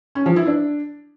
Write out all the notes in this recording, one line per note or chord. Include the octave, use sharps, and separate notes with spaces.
C#4
F3
E4
D4